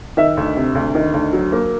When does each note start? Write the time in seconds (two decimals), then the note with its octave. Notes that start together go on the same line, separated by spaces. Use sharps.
0.17 D#3 E5
0.37 D2
0.56 C3
0.75 D2
0.95 D#3
1.14 D2
1.33 F#3
1.52 A#3